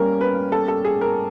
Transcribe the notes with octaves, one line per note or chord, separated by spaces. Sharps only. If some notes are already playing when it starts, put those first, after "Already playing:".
Already playing: G3 A#3 C#4 A#4
B4
A4
A4
G#4
A#4